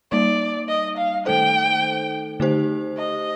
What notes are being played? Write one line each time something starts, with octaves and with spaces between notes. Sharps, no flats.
G3 A#3 D#4 D5
D#5
F5
D#3 A3 D#4 A4 C5 G5
D3 A3 D#4 G4 C5
D#5